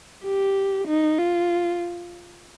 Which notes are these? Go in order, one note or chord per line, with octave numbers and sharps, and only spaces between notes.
G4
D#4
F4